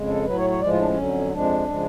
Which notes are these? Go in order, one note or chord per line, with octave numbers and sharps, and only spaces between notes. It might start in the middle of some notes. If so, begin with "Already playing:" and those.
Already playing: F2 C#3 G#3
A4
A2 F#3 B4
C#5
C#5
A2 F3 G#3 D5
F4
D4
C#4
F2 D3 F#3
F2 F3 G#3 D4
C#3 F3 G#3